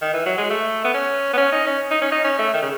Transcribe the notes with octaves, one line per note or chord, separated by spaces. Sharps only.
D#3
E3
F#3
G#3
A3
B3
C#4
B3
C#4
D#4
C#4
D#4
C#4
D#4
C#4
A3
D#3
C#3